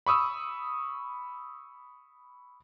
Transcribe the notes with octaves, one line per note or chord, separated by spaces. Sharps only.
B5 C#6 D#6 E6